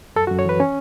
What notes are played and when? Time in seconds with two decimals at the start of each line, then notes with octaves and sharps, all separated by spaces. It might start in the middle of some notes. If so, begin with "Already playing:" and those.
0.16 F#2 A4
0.27 F#4
0.31 F#2
0.39 C#5
0.45 E3 B4
0.60 C#4